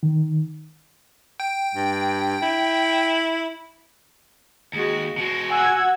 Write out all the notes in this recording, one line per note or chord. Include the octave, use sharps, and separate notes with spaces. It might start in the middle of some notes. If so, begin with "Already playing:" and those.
D#3
G5
G2
E4
D#2 G#3 F#4
B2 G#3 F#4
F#5 G#5 E6 G#6